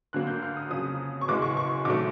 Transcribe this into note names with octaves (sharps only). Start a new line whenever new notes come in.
D2 D3 F#3 A#3 F#6
G6
F6
D#6
F2 C#3 F#3 D#6
C#6
F#1 E2 B2 G#3 D6
C#6
C#6
A#1 D#3 F#3 A3 D6